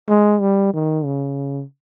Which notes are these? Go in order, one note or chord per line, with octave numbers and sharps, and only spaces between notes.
G#3
G3
D#3
C#3